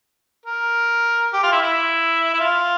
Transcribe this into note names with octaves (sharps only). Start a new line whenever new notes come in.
A#4
G4
F4
E4
E4
E4
F4